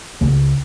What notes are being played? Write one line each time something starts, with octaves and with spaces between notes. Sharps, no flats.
C#2